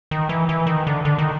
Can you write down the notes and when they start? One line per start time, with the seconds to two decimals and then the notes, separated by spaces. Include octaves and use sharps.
0.11 D#3
0.29 E3
0.49 E3
0.67 D#3
0.87 D3
1.05 D3
1.18 D#3